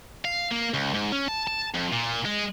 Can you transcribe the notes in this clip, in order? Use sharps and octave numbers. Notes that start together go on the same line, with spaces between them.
F5
A#3
C#2
G#2
C#4
A5
A5
F2
A#2
G#3